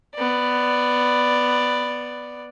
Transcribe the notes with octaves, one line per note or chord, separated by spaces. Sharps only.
B3 D5